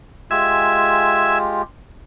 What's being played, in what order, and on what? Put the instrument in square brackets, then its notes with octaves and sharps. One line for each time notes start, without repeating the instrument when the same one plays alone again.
[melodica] G#3 F4 G4 [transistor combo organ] E5 G#5